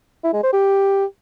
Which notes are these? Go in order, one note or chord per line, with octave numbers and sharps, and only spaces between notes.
E4
G#3
C5
G4